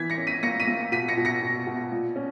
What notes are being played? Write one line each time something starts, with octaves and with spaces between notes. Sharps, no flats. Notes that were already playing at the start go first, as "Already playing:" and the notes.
Already playing: E3 G#6 B6
A#6 C#7
C#4
B6 D#7
A#3 A#6 C#7
B6 D#7
A#3
B2 B6 D#7
A#6 C#7
B2
A#6 C#7
B2
B2
A#2
C#4